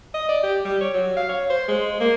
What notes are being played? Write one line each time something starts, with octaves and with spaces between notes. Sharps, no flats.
D#5
D5
G4
G3
C#5
F#3
F5
C#5
C5
G#3
A#3